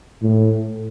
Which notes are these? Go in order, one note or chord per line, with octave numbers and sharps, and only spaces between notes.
A2